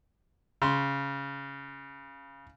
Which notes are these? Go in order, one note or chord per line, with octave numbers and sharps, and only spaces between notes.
C#3 C6